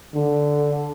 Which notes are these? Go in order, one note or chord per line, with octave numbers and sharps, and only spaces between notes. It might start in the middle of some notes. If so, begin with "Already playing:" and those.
D3